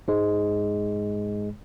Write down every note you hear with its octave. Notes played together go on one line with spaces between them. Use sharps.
G#2 G#3